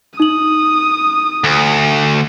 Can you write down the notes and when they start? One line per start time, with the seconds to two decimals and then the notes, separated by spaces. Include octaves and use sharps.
0.20 D#4 D#6 F#7
1.44 D2